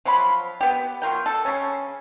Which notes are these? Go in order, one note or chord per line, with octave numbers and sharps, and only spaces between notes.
F3 F#3 F4 B5
B3 G4
F#3 F4 A#4 G5
A4
C#3 C#4